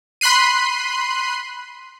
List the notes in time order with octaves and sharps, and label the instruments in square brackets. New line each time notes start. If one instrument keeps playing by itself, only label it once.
[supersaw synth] B5 C6 F#6 C7 D#7